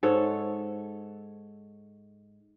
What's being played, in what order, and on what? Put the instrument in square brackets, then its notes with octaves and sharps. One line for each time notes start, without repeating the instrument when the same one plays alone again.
[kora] G#2 A4 C#5